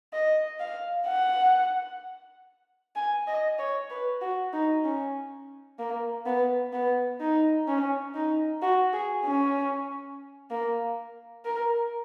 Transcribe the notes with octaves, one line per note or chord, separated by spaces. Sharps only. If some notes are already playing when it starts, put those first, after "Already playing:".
D#5
F5
F#5
G#5
D#5
C#5
B4
F#4
D#4
C#4
A#3
B3
B3
D#4
C#4
D#4
F#4
G#4
C#4
A#3
A#4